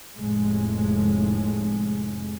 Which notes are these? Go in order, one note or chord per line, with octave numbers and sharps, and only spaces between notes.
F1 A2 G#3